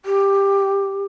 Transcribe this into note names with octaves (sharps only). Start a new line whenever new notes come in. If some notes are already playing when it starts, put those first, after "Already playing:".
G4